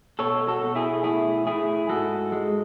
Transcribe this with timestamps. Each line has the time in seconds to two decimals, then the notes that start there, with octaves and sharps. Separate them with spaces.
0.19 B2 A4 C#5
0.47 F#4 A4
0.62 B2
0.75 E4 G#4
1.04 A2 E4 G#4
1.46 A2 E4 G#4
1.89 G#2 F#4 A4
2.32 G#3